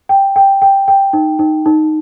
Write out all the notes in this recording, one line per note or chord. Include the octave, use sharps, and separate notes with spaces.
G5
G5
G5
G5
D#4
D#4
D#4